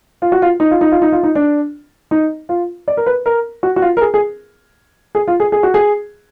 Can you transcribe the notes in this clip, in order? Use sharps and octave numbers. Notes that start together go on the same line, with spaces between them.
F4
F#4
F4
D#4
F4
D#4
F4
D#4
F4
D#4
D4
D#4
F4
D5
A#4
B4
A#4
F#4
F#4
F4
A#4
G#4
G#4
G#4
F4
G#4
G#4
F#4
G#4